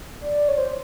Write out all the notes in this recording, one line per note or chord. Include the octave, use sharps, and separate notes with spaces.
D5
C#5
C5